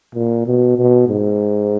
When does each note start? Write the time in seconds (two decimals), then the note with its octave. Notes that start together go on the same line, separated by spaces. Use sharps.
0.15 A#2
0.47 B2
0.77 B2
1.08 G#2